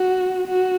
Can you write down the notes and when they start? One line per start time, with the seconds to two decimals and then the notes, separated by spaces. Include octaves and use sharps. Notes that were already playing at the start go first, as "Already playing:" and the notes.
Already playing: F#4
0.48 F#4